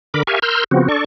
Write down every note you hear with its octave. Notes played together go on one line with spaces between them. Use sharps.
D3 A#4 B5 D6
G4 A#4 E5 F5 G#5 C#6
A#4 C6 E6 F6 G6
C#3 F3 B3 C4 F#4
D4 A4 D5 C#6